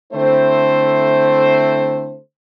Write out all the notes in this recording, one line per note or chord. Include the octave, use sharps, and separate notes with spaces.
D3 A3 C4 E4 A4 C5